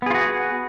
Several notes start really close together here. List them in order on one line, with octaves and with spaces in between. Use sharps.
B3 G#4 F4 F#4